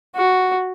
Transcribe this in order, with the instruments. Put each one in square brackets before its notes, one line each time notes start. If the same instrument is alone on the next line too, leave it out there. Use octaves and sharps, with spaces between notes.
[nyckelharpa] F#4